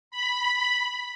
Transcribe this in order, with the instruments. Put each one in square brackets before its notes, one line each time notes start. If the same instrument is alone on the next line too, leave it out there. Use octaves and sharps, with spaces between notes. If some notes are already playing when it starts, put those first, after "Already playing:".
[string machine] B5